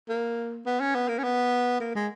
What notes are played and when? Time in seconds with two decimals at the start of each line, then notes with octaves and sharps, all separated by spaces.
0.09 A#3
0.66 B3
0.80 C#4
0.95 B3
1.08 A#3
1.18 C#4
1.24 B3
1.80 A#3
1.95 G#3